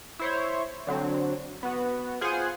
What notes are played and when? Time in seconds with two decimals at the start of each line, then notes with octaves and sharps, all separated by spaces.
0.19 E4 C5 C#5
0.87 D3 F#3 C4
1.63 B3 F#4
2.21 F4 G#4 C5 F#5 G#5